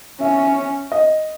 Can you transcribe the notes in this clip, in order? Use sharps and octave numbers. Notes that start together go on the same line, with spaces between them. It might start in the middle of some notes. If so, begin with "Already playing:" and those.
C#4 E5
D#5